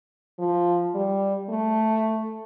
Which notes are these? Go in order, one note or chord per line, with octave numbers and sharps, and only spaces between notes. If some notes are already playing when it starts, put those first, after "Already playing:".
F3
G3
A3